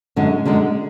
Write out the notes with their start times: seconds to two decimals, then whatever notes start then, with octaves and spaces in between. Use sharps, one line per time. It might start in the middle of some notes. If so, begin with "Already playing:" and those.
0.16 F#2 D3 G#3
0.46 F#2 D3 G#3